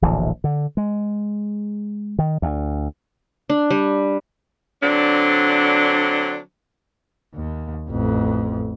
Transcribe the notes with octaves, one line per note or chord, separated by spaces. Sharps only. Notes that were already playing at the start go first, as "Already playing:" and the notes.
D1 A#1 E3
D3
G#3
D#3
D2
D4
G3
D3 F#3 C4 D4
D#2
A1 F2